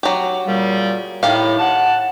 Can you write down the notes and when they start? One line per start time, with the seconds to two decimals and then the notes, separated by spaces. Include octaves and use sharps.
0.03 F#3 G4
0.46 A#2 C#3 G3
1.23 A2 D#3 G4 F5
1.59 F#5 A5